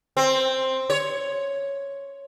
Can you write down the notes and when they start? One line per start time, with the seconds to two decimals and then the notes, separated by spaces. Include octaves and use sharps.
0.17 C4
0.90 C#5